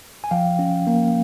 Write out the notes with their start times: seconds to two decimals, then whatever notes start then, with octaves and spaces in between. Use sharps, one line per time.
0.24 G#5
0.31 F3 F5 G5
0.59 C#4
0.87 A#3